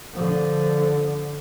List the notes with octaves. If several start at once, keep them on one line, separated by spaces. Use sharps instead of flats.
D3 F3